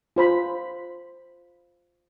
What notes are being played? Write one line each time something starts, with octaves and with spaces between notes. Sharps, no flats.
F4 C5 B5